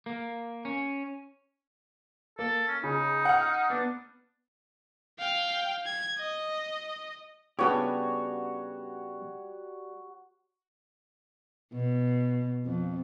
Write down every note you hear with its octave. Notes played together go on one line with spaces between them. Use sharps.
A#3
C#4
A#3 A4
C#4
C#3 D#4
F#5 F6
B3 D4
F5 G5
G#6
D#5
C#3 G3 B3 D4 F#4 G4 C#5
B2
F2